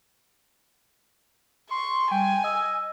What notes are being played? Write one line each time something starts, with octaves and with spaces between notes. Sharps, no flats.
C6 C#6
G3 G5 G#5
D#5 E6